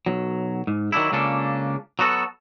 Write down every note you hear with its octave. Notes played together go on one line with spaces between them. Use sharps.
B1 F#3
G#2
D#3 F#3 D4 E4
C#2 C#3 A#3 D4 A4
F#3 B3 F#4 A4